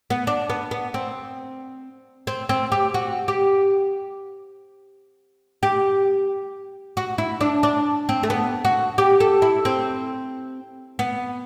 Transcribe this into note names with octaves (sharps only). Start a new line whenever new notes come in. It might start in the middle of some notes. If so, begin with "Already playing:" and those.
B3
D4
B3
B3
C4
C4
C4
G4
F#4
G4
G4
F#4
E4
D4
D4
C4
A3
B3
F#4
G4
A4
E4
C4
B3